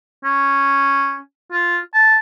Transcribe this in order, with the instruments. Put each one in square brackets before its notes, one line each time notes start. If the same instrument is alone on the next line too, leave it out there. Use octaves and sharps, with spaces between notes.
[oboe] C#4
F4
A5